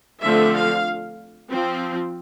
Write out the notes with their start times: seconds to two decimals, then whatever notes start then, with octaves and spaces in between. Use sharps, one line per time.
0.23 D3 F3 A3 C4 E5
0.55 F5
1.50 F3 C4